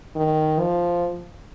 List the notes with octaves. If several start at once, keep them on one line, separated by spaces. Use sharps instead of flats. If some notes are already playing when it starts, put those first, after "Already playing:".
D#3
F3